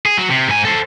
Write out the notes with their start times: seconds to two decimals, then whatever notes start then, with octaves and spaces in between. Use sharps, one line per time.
0.06 G#4
0.17 F#3
0.30 C3
0.47 G#2 G#5
0.65 A4 C5